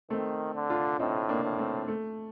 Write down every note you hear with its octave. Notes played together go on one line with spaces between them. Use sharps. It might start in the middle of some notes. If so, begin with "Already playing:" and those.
D#3 A3 C4
D3
D4 F4
A2 C4 D#4
A#3 D4
A2
A3 C4
A3